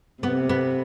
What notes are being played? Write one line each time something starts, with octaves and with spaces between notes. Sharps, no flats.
C3 B3
B3